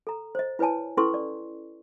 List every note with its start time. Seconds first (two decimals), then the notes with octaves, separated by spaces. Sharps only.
0.07 A4 A#5
0.35 C5 D#5
0.59 E4 B4 C#5 G#5 A5
0.97 C#4 E4 A4 B4 C6 C#6
1.14 D5